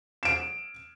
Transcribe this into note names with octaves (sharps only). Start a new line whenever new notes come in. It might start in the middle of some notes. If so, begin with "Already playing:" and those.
D7 E7